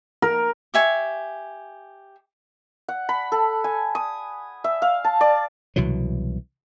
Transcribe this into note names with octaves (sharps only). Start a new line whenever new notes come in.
A#4
G4 E5 G#5 C#6
F#5
B5
A4
G#5
D#6
E5
F5
A5
D5
C2 B2 E3 F#3